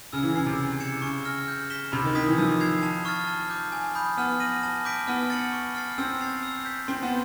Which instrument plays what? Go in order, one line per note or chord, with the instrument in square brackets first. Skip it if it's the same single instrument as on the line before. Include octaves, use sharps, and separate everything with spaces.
[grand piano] C#3 [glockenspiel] E6
[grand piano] E3
[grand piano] C#3 [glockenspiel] G#6 C7
[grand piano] C3
[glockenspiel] E6
G#6 C#7 E7
[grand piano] C#3 [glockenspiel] C#6
[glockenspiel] F6 A#6
G6
B6 E7 G7
[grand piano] C3 [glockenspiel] B5
[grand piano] D#3
[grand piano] D#3 [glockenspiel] D#6 G#6 B6
[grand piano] E3
[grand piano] F3 [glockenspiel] E6
[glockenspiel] G#6 C7 F7
A5
C#6 F6 A6
A5
D6 G6
G#5
B5 D#6 G6
[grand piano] B3 [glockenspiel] F6
[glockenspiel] A#6 D#7 F#7
A5
D6 G6 B6 D7
[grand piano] B3 [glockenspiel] F6
[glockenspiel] A6 C#7 F#7
C#6
F6 A6 C7
[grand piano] C4 [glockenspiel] E6
[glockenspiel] A6 C7 F7
E6
G6 B6
[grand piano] C4 [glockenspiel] C6
[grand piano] B3